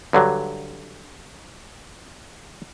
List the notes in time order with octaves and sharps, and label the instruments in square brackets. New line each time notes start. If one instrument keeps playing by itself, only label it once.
[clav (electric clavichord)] G2 D3 F#3